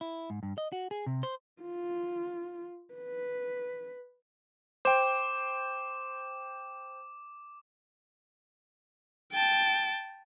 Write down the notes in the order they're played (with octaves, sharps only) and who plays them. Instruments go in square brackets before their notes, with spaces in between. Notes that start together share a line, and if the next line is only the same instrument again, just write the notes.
[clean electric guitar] E4
G#2
G2
D#5
F#4
G#4
C3
C5
[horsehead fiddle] F4
B4
[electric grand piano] C5 G5 [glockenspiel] D6 E7
[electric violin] G5 A5